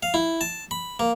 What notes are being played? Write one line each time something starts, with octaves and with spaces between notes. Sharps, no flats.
F5
E4
A5
B5
A#3